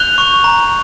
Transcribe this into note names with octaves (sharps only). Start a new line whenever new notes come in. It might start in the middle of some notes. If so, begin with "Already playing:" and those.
Already playing: F#6 G6 F7 G7
C#6
A#5